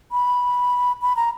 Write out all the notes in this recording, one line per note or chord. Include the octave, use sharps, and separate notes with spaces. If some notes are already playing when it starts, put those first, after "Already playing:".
B5
B5
A#5